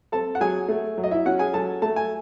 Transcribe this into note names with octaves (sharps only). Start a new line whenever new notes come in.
C4 A4 A5
F#5
F#3 G#4 G#5
A3
F#3
D#5
E4 E5
C#4 F#4 F#5
G#4 G#5
F#3 A4 A5
A3 A5
G#5